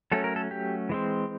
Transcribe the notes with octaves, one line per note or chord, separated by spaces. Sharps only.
F#3 A3 C#4 A4
A#4
A4
G4
E3 G#3 C4